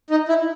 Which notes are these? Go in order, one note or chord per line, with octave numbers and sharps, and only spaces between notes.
D#4
E4